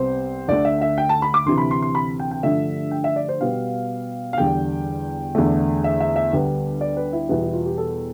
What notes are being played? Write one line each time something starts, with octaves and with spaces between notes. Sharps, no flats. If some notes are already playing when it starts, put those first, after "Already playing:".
Already playing: C2 C3 G3 B3 C5
D2 D3 A3 D5
E5
E5
G5
A5
B5
D6
D2 C3 E3 C6
B5
C6
C6
B5
G5
G5
G2 D3 F3 A3 E5
G5
E5
D5
C5
B2 G3 B3 F5
F5
E2 D3 G3 G5
E2 D3 A3
E5
E5
E5
D2 D3 G3 B3
D5
B4
E4
E2 B2 G3 B3 E4
E4
F4
G4
A4